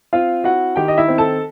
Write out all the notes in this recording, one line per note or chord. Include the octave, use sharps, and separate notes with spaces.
C4 F4 F5
E4 F#4 F#5
D#3 G4 G5
D#5
E4 E5
C4
A4 A5